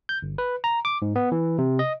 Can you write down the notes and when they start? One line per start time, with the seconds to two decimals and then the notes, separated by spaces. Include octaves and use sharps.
0.09 G6
0.22 G1
0.38 B4
0.64 A#5
0.85 D6
1.02 G#2
1.16 B3
1.32 E3
1.58 C3
1.79 D#5